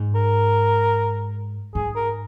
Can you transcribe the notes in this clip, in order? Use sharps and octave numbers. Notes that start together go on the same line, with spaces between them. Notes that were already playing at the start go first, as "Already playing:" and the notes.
Already playing: G#2
A#4
G#2 G#4
A#4